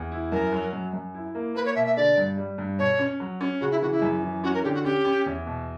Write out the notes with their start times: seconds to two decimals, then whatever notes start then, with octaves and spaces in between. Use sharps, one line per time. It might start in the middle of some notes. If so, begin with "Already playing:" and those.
Already playing: E2
0.12 E4
0.32 F#2 A#4
0.52 F#3
0.73 F#2
0.93 F#2
1.15 E4
1.35 A#3
1.55 A#3 B4
1.65 C#5
1.75 B2 E5
1.86 E5
1.96 D3 D5
2.17 G2
2.37 G3
2.58 G2
2.79 B2 C#5
2.99 C#4
3.20 F#3
3.41 C#4
3.61 C#3 F#4
3.71 E4
3.81 E3 F#4
3.91 E4
4.02 F#2
4.23 E3
4.44 C#4 F#4
4.54 A#4
4.63 D3 G4
4.74 F#4
4.84 C#4 G4
5.05 C#4
5.26 E2
5.46 B2